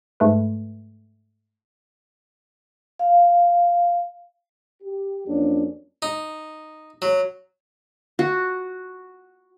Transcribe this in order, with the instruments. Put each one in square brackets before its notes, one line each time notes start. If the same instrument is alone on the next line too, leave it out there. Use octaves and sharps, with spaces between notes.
[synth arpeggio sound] G#2 A3 B4
[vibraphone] F5
[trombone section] G4
F2 F#3 A#3 C#4 D4
[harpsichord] D#4
F#3
[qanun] F#4